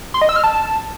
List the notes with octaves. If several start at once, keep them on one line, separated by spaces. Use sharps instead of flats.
C6
D#5
E6
F6
A5